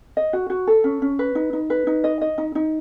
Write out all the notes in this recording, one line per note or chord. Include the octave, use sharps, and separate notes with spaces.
D#5
F#4
F#4
A4
C#4
C#4
B4
D#4
D#4
B4
D#4
D#5
D#5
D#4
D#4